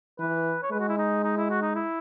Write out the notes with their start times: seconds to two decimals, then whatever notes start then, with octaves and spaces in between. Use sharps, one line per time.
0.19 E3 B4
0.63 C#5
0.71 G#3 B4
0.80 F#4
0.88 E4
0.98 D#4
1.24 D#4
1.37 E4
1.50 F#4
1.62 D#4
1.75 E4